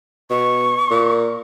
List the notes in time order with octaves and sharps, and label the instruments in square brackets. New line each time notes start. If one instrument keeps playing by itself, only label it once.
[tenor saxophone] B2 [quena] C#6
[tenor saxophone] A#2